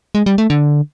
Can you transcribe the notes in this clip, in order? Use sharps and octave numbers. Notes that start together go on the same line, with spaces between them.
G#3
G3
A3
D3